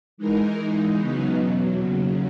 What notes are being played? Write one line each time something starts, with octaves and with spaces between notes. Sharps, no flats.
E3 G#3 D#4 A#4
E3 G#3 D#4
C#3 F#3 B3 D#4
E2 B2 F#3
D#2 C#3 F#3